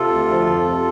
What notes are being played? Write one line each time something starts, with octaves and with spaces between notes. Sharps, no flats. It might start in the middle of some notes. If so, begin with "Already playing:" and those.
Already playing: C3 F4 A4
D2
F3
F2
C3